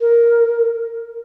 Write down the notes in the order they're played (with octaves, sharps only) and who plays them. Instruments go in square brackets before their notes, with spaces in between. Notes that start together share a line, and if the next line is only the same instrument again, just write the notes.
[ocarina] A#4